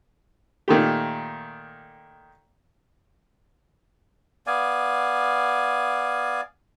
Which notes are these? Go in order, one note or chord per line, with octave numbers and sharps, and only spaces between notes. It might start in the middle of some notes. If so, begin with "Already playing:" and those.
A#2 D#3 A3 G4
B3 D5 F5 G#5